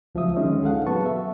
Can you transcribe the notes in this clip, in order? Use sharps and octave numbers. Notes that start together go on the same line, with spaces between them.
C#2 F3 F#3 E5 D#6
D3 D#3 G#3 C#4 D#4
G#4 A4 F5 F#5
F#3 B3 B4 A5 C#6
E5